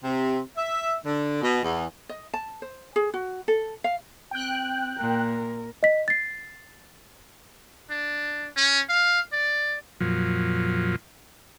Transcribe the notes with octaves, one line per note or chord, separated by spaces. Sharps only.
C3
E5
D3
B2
E2
D#5
A5
C5
G#4
F#4
A4
F5
C4 G5 F#6
A#2 A#4
D#5 B6
A6 C7
D4
C#4
F5
D5
F2 A#2 F3 F#3